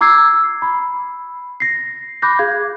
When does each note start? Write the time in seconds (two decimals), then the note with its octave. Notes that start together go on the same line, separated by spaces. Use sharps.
0.01 A#5 D6 E6 G#6 C7
0.62 B5
1.60 A#6 C7
2.22 B5 D6 F#6 G6 A#6
2.39 G#4 F5 G#6